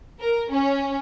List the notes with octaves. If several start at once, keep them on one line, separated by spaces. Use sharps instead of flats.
A#4
C#4